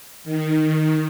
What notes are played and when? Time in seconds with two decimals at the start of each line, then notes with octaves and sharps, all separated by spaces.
0.24 D#3